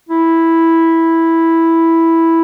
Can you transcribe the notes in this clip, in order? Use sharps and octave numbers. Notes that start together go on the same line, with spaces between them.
E4